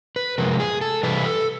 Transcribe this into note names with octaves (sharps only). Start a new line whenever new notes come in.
B4
C3 F3 G#3 A#4
G#4
A4
C3 E3 G3 B4
A4